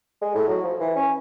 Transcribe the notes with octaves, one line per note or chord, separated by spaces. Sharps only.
G#3
A2
F#3
F3
E3
C#4